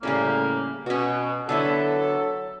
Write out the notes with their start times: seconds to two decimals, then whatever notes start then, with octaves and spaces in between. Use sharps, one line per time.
0.03 A2 C#3 G3 A#3 C#4
0.86 B2 C#4 F#4
1.49 D3 F#3 B3 E4 A4